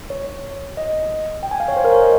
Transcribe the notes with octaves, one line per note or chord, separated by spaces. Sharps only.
C#5
D#5
G5
G#5
F5
C#5
C5
A#4
C#5
D#5